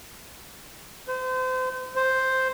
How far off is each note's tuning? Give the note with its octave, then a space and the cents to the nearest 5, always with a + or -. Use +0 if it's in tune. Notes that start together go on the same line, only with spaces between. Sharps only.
C5 -35
C5 +0